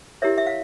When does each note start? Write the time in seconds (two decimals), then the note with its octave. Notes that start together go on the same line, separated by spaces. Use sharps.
0.22 E4 G4 A#4 C#5 E5
0.38 E5
0.47 F5